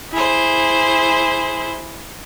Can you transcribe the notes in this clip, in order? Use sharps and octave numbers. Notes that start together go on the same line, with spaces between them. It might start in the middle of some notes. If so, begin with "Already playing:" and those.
E4 G#4 C5